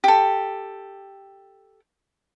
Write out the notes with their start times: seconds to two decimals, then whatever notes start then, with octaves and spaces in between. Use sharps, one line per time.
0.04 G4 A4